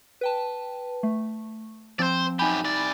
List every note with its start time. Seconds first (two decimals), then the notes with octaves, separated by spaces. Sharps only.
0.21 B4 G5 A5
1.03 A3
1.99 F3 C4 C5 D5
2.39 F#2 D#4 G4 G#5 B5
2.64 C3 D5